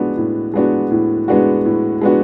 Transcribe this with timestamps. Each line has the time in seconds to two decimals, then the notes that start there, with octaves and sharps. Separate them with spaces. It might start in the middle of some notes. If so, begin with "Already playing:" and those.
Already playing: A2 G#3 B3 D4 F#4
0.17 A2
0.54 G#3 B3 D4 F#4
0.91 A2
1.28 G#3 B3 D4 F#4
1.65 A2
2.01 G#3 B3 D4 F#4